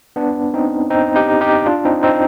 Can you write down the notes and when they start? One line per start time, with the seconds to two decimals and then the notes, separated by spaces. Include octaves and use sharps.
0.16 B3 D4
0.54 C4 D#4
0.90 C4 D#4
1.16 D#4 G4
1.41 D#4 G4
1.66 D4 F4
1.85 C4 D#4
2.03 C4 D#4